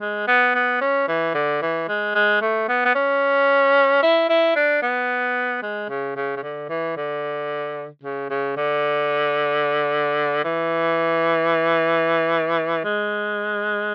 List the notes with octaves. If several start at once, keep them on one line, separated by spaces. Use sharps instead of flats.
G#3
B3
B3
C#4
E3
D3
E3
G#3
G#3
A3
B3
B3
C#4
E4
E4
D4
B3
G#3
C#3
C#3
C#3
D3
E3
D3
C#3
C#3
D3
E3
G#3